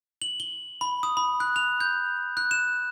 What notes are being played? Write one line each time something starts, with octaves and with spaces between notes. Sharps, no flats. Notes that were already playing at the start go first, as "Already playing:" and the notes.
F#7
G7
B5
D#6
B5
F#6
F7
G6
F#6
E7